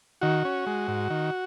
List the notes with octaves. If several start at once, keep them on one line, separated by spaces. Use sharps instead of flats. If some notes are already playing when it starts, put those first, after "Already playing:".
D#3 F#4
C#4
G#3
G#2
D#3